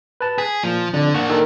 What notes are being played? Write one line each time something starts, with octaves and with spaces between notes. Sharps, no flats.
B4 A5
G#4 B6
A#2 F3
F2 D3 D4
A#3 D4 F#5 C#6
D#3 A4 A#4